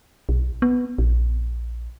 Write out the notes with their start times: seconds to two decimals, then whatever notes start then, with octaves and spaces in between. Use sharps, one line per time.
0.29 B1
0.62 B3
0.98 A#1